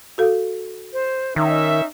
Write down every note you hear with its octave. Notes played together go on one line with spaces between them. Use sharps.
F#4 A4 F5
C5
D#3 C#4 D#4 E5